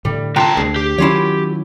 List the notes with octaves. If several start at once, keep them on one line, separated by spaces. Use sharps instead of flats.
A2 D3 G3
C2 F4 G5 A5 A#5
D2 G#4
G4
D#3 F#3 C#4 E4 F4 C#5